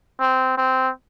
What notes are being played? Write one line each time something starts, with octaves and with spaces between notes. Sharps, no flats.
C4
C4